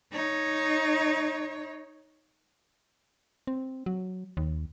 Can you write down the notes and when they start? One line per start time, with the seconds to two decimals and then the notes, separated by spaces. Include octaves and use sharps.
0.11 D#4 C#5
3.47 C4
3.86 F#3
4.37 D#2